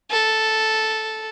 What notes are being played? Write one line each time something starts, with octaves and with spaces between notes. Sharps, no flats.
A4